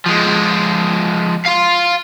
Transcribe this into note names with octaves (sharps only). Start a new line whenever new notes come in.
F3 G#3
F5 C6